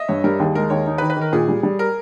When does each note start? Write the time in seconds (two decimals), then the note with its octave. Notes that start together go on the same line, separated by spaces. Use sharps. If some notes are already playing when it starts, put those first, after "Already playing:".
Already playing: D#5 E5
0.08 G2 C#5
0.24 G3 A#4
0.40 D#2 G#4
0.55 G#3 A#4
0.70 D#2 C#5
0.86 D#4
0.98 B4
1.02 D#3
1.10 B4
1.17 D#3 A#4
1.33 A#2 G#4
1.48 G3
1.63 G3
1.79 A#4